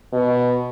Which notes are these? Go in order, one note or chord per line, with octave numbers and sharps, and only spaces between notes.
B2